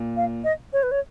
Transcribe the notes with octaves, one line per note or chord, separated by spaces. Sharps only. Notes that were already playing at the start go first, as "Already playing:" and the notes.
Already playing: A#2
F5
D#5
C#5
B4
C#5